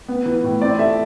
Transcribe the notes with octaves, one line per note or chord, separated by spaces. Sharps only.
B3
E3
A2
C4 D5
A3 E5